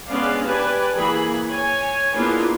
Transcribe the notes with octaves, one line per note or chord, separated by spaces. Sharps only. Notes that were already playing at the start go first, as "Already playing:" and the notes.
G#3 B3 C#4 D4 D5 F5
G4 B4 D5 G#5 A5
E3 A#3 G#4 B5
C#5 G#5
A#3 B3 D4 E4 F4 G#4